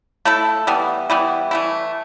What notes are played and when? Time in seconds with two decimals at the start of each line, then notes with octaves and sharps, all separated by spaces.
0.25 A3 E4 A4
0.67 E3 G3 B3
1.10 E3 G3 B3
1.51 E3 A3 E4